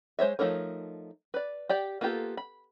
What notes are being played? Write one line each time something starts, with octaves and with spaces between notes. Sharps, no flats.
G#3 C5 C#5 E5
F3 A3 D#4 A#4 C#5
B4 D5
G4 D5 G5
A#3 B3 F4 G4 A4
B5